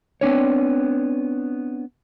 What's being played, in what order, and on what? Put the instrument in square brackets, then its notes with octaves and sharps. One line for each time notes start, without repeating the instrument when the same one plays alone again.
[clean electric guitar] B3 C4 D4 C#5